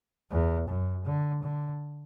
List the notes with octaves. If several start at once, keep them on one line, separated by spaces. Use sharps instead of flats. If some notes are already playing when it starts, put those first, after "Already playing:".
E2
F#2
D3
D3